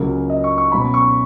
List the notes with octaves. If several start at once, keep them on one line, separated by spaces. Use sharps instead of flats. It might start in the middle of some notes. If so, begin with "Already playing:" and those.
Already playing: C#2 C#3 F#3 A#3
D#5
C#6
C#6
B2 F#3 C#4 B5
C#6